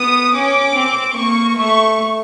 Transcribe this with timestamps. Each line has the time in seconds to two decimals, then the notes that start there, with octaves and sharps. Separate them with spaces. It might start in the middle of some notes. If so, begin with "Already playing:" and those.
Already playing: B3 D#6
0.34 C#4 D6
0.75 C4
1.16 A#3 C#6
1.57 A3 C#6